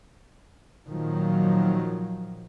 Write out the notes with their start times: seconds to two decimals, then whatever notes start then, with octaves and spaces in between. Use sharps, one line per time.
0.88 A#2 D#3 F3 F#3